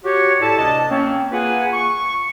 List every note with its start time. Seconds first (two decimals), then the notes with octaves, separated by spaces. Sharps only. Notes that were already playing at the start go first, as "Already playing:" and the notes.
0.04 F#4 G4 C#5
0.40 A2 E4 A4 D5 A5
0.58 D2 C3 D4 D#5 A5
0.90 A#3 C4 C#4
1.32 A#3 F4 G#4 B4 F#5 G#5
1.73 C#6